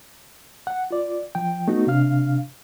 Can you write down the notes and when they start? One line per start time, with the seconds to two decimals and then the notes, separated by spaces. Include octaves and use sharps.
0.67 F#5
0.91 F4 D5
1.35 F3 G5
1.68 A3 B3 D#4 F#4
1.87 C3 D4 F5 F6